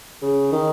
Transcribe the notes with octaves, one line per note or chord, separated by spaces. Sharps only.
C#3
D#3